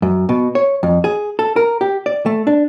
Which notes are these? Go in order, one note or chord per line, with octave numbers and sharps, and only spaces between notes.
F#2
B2
C#5
F2
G#4
A4
A#4
G4
D5
A3
D4